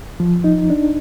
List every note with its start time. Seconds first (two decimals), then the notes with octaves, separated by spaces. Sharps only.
0.20 F3
0.44 D#4
0.70 D4